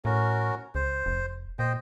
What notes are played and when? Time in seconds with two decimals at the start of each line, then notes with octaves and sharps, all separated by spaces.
0.05 A2 C#4 F#4 A#4
0.75 C#2 C5
1.06 F1
1.59 A#2 C5 D#5 G5